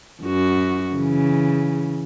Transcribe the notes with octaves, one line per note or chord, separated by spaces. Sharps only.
F#2 F#4
C#3 E3